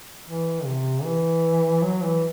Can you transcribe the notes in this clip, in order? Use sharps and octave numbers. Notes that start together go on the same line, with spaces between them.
E3
C3
E3
F#3
E3